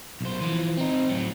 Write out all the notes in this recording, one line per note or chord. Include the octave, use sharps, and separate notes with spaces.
B1 C5
E3 F3
C4 D#4
A2 F#3